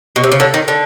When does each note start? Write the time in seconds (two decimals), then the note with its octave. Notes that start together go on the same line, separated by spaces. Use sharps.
0.16 B2
0.24 C3
0.32 C#3
0.40 D3
0.54 D#3
0.68 D3